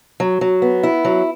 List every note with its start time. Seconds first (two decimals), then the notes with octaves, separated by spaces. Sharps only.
0.20 F#3
0.41 F#3
0.62 B3
0.83 E4
1.05 F#3